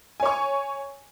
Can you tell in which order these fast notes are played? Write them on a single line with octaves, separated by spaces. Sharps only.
G#5 C#5 C#6